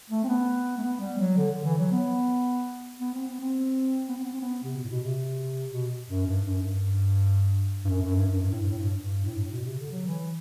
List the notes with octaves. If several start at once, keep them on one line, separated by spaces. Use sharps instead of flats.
A3
C4
B3
A3
B3
G3
F#3
D3
D3
E3
F#3
B3
B3
C4
B3
C4
B3
C4
B3
C4
B3
C3
B2
A2
B2
C3
B2
F#2
G2
F#2
G2
G2
F#2
F#2
G2
F#2
G2
A2
G2
A2
G2
G2
A2
G2
A2
B2
C3
D3
F#3
E3